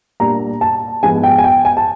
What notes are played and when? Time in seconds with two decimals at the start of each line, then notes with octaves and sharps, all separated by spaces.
0.20 A#2 G3 A#3 D4 A#5
0.61 A5
1.03 G#2 F3 G#3 B3 G#5
1.23 G5
1.38 G#5
1.44 G5
1.65 G#5
1.77 A5